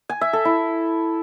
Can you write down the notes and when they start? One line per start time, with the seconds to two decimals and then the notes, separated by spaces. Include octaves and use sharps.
0.09 G#5
0.21 E5
0.33 A4
0.45 E4